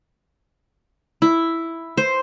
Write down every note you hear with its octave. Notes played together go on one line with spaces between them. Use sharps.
E4
C5